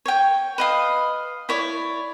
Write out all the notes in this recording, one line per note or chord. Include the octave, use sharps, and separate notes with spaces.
C#5 G5
B4 D#5 F5
E4 C#5 D5